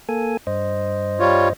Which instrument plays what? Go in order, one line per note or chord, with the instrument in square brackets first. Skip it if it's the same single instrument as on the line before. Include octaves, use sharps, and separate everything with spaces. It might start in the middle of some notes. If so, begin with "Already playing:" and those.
[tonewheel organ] A#3 A4 G#5
G2 C5 D#5
[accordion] G3 F4 C#5